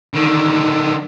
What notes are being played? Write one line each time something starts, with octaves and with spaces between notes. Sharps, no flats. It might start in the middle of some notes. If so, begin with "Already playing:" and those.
D3 D#3